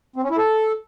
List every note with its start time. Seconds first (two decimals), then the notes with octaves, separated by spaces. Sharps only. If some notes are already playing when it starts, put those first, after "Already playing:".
0.16 C4
0.23 C#4
0.30 E4
0.37 A4